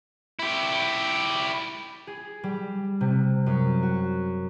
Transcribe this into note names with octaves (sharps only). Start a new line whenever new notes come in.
E4 G4
G#4
G3
C3
F#2
F#4